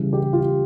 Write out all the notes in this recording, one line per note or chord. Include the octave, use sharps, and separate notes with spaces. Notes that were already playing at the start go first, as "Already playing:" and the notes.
Already playing: C#3 E3 G3
G4
F4